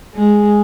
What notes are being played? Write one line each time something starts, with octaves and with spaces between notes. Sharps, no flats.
G#3 G#4